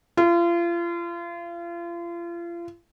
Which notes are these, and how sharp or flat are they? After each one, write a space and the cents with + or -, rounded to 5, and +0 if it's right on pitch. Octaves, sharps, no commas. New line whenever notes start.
F4 -35